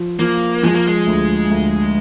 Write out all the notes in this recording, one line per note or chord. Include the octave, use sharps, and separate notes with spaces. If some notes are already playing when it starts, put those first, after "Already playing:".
Already playing: F3
F3 A#3
F3 G#3
A#3
G#3
D2
D2